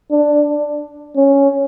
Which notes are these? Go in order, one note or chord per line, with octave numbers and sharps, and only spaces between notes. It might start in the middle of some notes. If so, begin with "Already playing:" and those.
D4
C#4